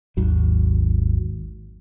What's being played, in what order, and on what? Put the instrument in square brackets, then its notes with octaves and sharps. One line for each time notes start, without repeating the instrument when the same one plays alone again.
[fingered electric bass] G#1 D#2 F#3